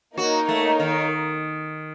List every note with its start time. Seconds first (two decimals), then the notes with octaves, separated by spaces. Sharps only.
0.17 A#3 D#4 F#4 A#4 C#5
0.49 A3
0.80 D#3